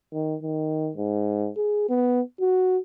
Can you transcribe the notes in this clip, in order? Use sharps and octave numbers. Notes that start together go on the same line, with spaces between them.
D#3
D#3
G#2
G#4
B3
F#4